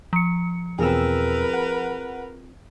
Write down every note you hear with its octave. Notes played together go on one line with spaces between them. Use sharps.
F3 C#7
E2 B2 C4 F4 G#4 A#4 B4 E6
F#5